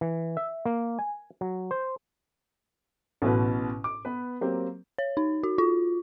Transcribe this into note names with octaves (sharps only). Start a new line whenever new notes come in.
E3
E5
A#3
G#5
F#3
C5
A1 B2 B4
D6
B3 B4
F#3 A#3 C4 G4
C#5
D#4
F#4
F4